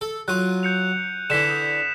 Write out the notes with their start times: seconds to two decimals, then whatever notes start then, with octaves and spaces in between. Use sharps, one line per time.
0.01 A4
0.28 F#3 F4 F#6 D#7
0.63 G6 C#7 F7
1.30 D3 E3 B6 E7
1.50 D#6 G6